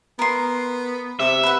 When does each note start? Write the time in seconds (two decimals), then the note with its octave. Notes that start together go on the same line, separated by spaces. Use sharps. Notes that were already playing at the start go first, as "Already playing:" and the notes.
0.19 B3 A#4 C6
1.20 C3 E5
1.43 B4 F#5